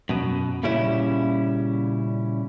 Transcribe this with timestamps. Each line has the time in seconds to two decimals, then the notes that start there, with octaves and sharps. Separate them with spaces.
0.09 F#2 B2
0.63 A#2 C#3 G3 C#4 E4